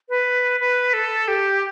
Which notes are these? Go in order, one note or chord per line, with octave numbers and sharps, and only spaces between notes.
B4
B4
A4
G4